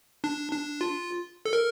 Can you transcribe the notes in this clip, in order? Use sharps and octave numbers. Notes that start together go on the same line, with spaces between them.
D4
D4
F4
A4
A#4